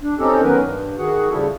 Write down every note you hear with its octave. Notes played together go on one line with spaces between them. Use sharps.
D4
C4 C#4 D#4 G4 A4
D#3 F#3 B3 C#4 A#4 B4
G2
D#3 F#4 G#4 F#5
C#3 F3 G3 E4 A4